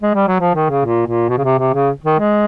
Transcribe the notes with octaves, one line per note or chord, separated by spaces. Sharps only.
G#3
G3
F#3
F3
D#3
C#3
A#2
A#2
B2
C#3
C3
C3
C#3
D#3
G#3